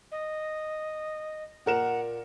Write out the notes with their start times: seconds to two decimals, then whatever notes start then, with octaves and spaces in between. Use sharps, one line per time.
0.12 D#5
1.66 A#2 A#4 F#5 E7